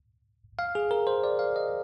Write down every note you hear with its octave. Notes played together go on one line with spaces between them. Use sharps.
F5
G#4
A#4
C5
D5
F5
D#5